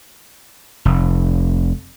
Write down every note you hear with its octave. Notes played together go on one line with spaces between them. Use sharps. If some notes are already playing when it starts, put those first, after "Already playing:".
F1